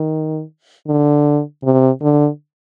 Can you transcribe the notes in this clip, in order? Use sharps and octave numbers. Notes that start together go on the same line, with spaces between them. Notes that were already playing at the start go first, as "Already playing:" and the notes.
Already playing: D#3
D3
C3
D3